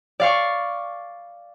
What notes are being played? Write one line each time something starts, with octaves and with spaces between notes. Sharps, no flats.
D5 F5 C#6